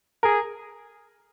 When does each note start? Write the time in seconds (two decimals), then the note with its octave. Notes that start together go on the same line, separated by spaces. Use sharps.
0.23 G#4 A#4